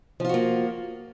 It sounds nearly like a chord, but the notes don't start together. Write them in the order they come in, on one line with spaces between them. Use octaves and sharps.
F3 F4 F#4 A#3